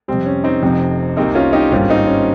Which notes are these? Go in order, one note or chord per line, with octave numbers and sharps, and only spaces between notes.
F2 C3 G3 C4
C#4
C4 D#4
F1 F2 C3
C2 C3 G3 A#3 C4 D#4
C#4 F4
D#4 G4
G#1 G2 G3 A#3 C#4 F4
C4 D#4
C#4